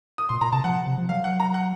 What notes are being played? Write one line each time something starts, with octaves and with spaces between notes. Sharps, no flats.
D#6
A#2 C6
A#2 A#5
C3 A5
F3 F#5
C3
F3
F#3 F5
F#5
A#5
F#5